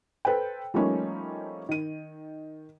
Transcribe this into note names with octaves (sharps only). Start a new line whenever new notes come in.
A4 B4 C5 G5
F3 G3 A3 A#3 C#4 D#4
D#3 D#7